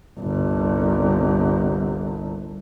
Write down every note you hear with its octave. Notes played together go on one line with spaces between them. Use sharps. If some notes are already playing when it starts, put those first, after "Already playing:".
G1 C2